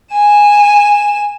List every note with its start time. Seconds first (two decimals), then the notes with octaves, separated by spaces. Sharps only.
0.13 G#5 E7